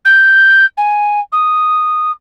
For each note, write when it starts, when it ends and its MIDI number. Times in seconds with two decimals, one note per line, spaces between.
0.05 0.65 91
0.77 1.20 80
1.32 2.11 87